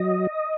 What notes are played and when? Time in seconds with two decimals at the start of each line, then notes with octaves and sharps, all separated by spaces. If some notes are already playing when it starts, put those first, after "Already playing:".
Already playing: F#3 D#5